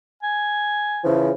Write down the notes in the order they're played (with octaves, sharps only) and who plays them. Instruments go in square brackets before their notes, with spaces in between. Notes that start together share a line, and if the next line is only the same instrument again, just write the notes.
[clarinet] G#5
[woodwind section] C#3 E3 F3